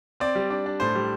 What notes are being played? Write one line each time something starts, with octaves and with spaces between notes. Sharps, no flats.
C4 D5
G3
D4
D4
A2 C5
G3